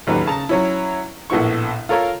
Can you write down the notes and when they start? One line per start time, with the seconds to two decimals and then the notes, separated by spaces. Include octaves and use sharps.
0.07 A1 D#2 F#3 G4 B4
0.26 C#3 A5 A#5
0.49 F#3 C#4 E4
1.30 A#1 A2 B3 E4 C#6
1.89 F4 A4 A#4 C#5 F5